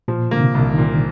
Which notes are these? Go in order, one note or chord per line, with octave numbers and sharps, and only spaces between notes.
A#2 F3
D3 A#3
C3
C2
D#3
A#2